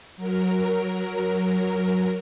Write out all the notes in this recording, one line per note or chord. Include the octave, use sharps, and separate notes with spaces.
F#3 A#4